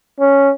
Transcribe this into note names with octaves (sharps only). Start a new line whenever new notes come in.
C#4